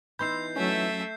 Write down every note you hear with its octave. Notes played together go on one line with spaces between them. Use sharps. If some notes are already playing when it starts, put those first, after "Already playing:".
E3 B3 D#4 B5 C6 E6 G6 C7
F#3 A3 C#4 E5